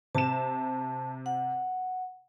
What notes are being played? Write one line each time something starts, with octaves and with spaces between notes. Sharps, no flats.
C3 A5 E7
F#5